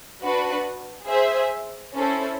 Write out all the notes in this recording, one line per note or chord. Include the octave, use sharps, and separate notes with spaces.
D4 F#4 B4
G#4 C5 E5
C#4 E4 A4 C5